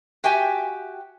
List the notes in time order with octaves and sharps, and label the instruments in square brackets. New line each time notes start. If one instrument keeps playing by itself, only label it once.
[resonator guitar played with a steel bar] F#4 G4 E5 G5 G#5